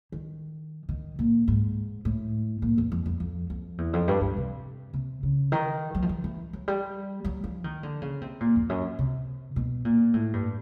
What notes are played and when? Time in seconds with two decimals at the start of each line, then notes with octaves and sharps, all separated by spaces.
0.12 D#3
0.89 D#3
1.19 A#2
1.48 G#2
2.05 A2
2.62 A#2
2.78 E2
2.92 F2
3.06 F2
3.20 F2
3.50 F2
3.78 E2
3.93 F2
4.08 G2
4.21 G2
4.37 C3
4.93 C3
5.23 C#3
5.52 D#3
5.95 F#3
6.02 F3
6.09 E3
6.24 E3
6.53 F#3
6.68 G3
7.25 F#3
7.44 F3
7.64 D#3
7.83 D3
8.02 C#3
8.21 C3
8.40 A#2
8.56 F2
8.69 F#2
8.99 C3
9.56 B2
9.85 A#2
10.14 A2
10.33 G2